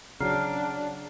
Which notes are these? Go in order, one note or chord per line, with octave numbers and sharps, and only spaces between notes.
C#3 F#3 D4 A#5 F6 C7